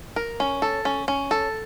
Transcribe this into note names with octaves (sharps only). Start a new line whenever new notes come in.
A#4
C#4
A4
C#4
C#4
A4